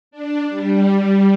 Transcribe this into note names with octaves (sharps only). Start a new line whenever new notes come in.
D4
G3